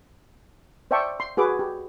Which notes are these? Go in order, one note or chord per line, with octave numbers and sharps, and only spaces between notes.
C5 D5 E5 G5 A5 C#6
C6
F#4 G#4 B4 D6
G4